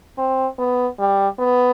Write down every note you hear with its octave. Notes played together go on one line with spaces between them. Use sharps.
C4
B3
G3
B3